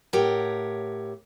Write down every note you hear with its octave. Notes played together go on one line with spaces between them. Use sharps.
A2 G4 A#4 C#5 F#5